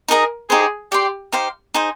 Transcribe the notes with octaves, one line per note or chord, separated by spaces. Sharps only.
D#4 G#4 A#4 D#5 A#5
D#4 G4 G#4 C5
G4 D5 G5 C6
D#4 G4 C5 F5
D#4 G#4 C5